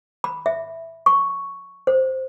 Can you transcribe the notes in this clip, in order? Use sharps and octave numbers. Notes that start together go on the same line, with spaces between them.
B5
E5
C#6
C5